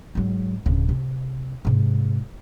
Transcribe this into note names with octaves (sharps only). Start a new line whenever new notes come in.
G#2 F#3
D1 C#3
C3
G#2 C3